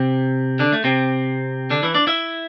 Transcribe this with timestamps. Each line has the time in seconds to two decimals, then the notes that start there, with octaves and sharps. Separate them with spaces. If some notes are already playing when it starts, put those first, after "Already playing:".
Already playing: C3 C4
0.59 D3 D4
0.72 A3
0.84 C3 C4
1.70 D3 D4
1.83 E3 E4
1.94 D4 D5
2.07 E4 E5